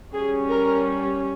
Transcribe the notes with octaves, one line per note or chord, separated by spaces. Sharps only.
G3 C#4 G#4
A#4